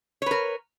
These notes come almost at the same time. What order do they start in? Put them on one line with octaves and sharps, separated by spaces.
C#5 B4 A#4